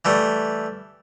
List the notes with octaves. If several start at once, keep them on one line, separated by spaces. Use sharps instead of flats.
E3 G3 A3